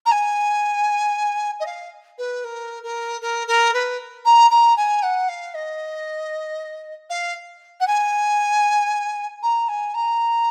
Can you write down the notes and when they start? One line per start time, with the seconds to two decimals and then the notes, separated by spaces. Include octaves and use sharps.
0.06 A#5
0.11 G#5
1.60 D#5
1.66 F5
2.18 B4
2.44 A#4
2.83 A#4
3.21 A#4
3.48 A#4
3.74 B4
4.25 A#5
4.51 A#5
4.77 G#5
5.03 F#5
5.29 F5
5.54 D#5
7.10 F5
7.80 F#5
7.87 G#5
9.42 A#5
9.69 G#5
9.94 A#5